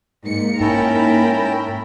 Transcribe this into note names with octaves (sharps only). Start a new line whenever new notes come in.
G#2 G#3 A#3 D#4 C#7
G#2 C#4 E4 A#4 G5 A5 B5